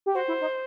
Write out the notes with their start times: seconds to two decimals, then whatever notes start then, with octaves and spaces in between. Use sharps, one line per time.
0.06 G4
0.15 F#4 C5
0.28 E4
0.41 D#4